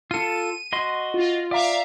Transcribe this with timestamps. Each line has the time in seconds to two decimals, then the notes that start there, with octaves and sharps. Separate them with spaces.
0.11 F4 A4 D#7
0.73 F#4 D#5 C6
1.14 F4
1.51 D5 E5 F5 A#5